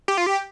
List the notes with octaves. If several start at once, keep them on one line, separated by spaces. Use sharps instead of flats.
G4
F4
G4